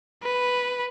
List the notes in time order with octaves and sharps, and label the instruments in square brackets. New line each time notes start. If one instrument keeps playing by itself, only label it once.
[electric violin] B4